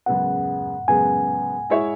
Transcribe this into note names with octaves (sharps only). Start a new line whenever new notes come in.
F#2 C#3 G#3 B3 F#5
F#2 C#3 G#3 B3 G#5
G#3 E4 C#5 E5